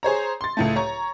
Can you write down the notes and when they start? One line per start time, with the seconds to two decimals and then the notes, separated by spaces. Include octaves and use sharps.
0.03 G#4 C5 C#5 A#5
0.41 C6 A6
0.57 C#2 A2 A3
0.76 C#5 A#5 C#6